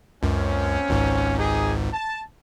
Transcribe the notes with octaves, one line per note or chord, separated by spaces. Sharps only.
C#2 F#2 A#3 C4 C#4
G#1 C#2 G#2
D#4 G4 G#4
A5